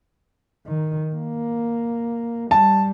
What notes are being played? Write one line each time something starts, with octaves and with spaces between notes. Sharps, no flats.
D#3
A#3
G3 A5